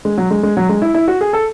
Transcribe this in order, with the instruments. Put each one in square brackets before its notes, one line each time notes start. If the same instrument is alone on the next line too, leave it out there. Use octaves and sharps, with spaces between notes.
[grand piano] G#3
F#3
G#3
G#3
F#3
G#3
E4
E4
F#4
G#4
A4